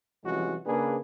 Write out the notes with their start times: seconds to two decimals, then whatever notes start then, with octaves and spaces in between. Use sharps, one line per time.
0.25 C2 E3 F3 G#3 C#4 F#4
0.66 C#3 A#3 D4 G#4 B4